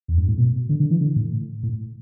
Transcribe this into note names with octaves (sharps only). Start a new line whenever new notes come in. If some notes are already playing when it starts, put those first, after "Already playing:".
E2
G2
A2
B2
D3
D3
E3
D3
A2
A2